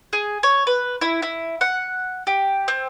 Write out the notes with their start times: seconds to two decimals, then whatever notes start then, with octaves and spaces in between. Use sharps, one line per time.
0.13 G#4
0.43 C#5
0.67 B4
1.01 E4
1.22 E4
1.61 F#5
2.27 G4
2.68 C4